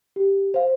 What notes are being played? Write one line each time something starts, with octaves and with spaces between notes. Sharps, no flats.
G4
C5 F5